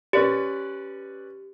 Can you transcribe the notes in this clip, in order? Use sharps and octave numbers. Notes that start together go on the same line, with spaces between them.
C#4 G4 B4 D5